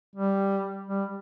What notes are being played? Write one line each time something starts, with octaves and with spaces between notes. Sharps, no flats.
G3
G3